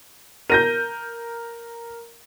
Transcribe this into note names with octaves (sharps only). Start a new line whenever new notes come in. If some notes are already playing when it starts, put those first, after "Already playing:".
A#4 G6 A#6 D#7